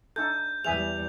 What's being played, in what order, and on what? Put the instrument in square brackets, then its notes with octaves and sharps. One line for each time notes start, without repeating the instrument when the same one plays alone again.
[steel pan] D4 D#4 A4 [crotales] G6
[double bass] E2 G3 [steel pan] G#4 E5 G#5 [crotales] F7